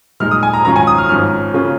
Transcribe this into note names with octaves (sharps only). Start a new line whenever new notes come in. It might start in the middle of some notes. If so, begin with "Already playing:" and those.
A#2 G#3 D#4 F6
D#6
G#5
A#5
G#2 D#3 C#4 F4 A#5
G#5
D#6
F6
G#1 G#2 F3 C#4 F6
C#3 A#3 C#4 F4